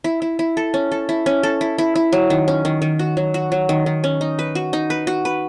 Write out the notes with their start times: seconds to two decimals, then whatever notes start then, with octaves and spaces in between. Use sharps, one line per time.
0.04 E4
0.22 E4
0.39 E4
0.57 A4
0.74 C#4
0.92 A4
1.09 E4
1.26 C#4
1.43 A4
1.61 E4
1.78 E4
1.95 E4
2.12 F#3
2.30 D#3
2.48 C#4
2.65 D#3
2.82 D#3
2.99 F#4
3.17 F#3
3.34 F#4
3.52 F#3
3.69 D#3
3.86 D#3
4.04 C#4
4.21 D#4
4.39 B4
4.55 F#4
4.73 D#4
4.90 B4
5.07 F#4
5.25 B4